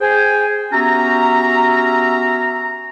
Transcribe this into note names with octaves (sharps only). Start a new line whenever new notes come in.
G#4 C5 G5 G#5
B3 C#4 F#4 G4 E5 A#5